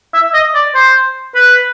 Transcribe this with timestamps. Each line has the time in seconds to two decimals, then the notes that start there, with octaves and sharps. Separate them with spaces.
0.14 E5
0.34 D#5
0.54 D5
0.74 C5
1.35 B4